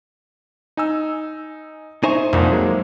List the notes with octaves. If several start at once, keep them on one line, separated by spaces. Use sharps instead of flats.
D#4 G#5 E6
D#4 C5 E5 G#5 C#6
C2 F2 A#2
F#3 G#3 A#3